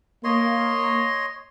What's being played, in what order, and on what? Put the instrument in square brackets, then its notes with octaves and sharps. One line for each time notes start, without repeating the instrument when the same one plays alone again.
[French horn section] A#3 [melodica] C#5 D#5 C6